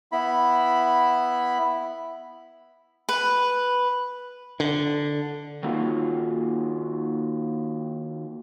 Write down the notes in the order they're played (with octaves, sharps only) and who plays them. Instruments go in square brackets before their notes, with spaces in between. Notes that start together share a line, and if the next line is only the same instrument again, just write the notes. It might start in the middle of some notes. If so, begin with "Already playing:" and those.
[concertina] B3 E4 B5
[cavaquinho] B4
[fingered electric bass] D3
[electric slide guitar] D#3 A#3 F4 F#4